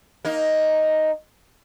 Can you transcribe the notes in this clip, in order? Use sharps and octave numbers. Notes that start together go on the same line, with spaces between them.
A#3 D#4